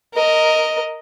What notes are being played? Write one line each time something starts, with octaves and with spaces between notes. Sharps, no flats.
A#4 D#5